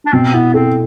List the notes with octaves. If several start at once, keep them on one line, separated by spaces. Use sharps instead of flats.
D4
B2 C4
B3 E4
C4 A4